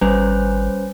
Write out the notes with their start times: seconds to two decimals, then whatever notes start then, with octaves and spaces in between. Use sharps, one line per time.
0.01 G#1 G3 C#4 B4 C5